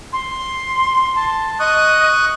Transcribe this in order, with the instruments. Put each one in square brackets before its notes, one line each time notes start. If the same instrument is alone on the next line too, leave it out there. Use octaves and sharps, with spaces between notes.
[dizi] C6
[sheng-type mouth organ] A5
[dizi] D#5 [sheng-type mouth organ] C#6 D#6 F#6